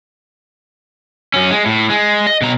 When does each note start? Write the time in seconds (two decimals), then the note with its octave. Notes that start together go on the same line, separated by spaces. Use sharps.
1.34 F#2 C#4
1.51 G#3
1.66 A2
1.90 G#3
2.27 D#5
2.42 B2 A#5